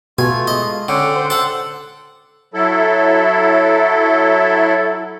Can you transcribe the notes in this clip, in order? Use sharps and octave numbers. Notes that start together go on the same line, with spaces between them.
B2 A3 F4 G#5
G#3 D#5
D3 C#4 F#5 G5 D6
C5
A4 F#5
F#3 E4 A4